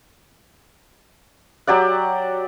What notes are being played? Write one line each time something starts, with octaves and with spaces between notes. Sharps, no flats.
F#3 G4 D5 F#5